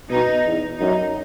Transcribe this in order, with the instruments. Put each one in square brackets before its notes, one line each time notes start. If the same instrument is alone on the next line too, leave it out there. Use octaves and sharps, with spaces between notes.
[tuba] B2 [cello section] D#4
[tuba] E2
[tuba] F#2 [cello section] D#4